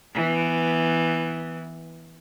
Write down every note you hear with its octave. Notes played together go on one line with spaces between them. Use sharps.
E3 B3